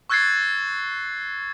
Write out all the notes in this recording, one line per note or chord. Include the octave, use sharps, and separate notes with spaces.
C#6 E6 F#6 G#6 A6 C7